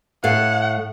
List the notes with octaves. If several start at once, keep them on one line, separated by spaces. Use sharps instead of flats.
A2 A3 F5 F#5